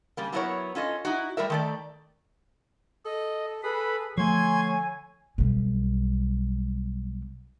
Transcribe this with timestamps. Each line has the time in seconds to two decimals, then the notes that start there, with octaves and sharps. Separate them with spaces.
0.17 C#3 G3 A#3
0.32 F#3 B3 E4 F#4 A#4 C#5
0.75 C#4 F4 A4 D#5
1.05 D#4 E4 F#4
1.37 G3 A3 A#4 E5
1.50 D#3 A3 D5
3.05 A4 D#5
3.63 G#4 A4 B4 B5
4.18 D3 F3 A3 C#5 G#5 C6 G#6
5.38 B1 G3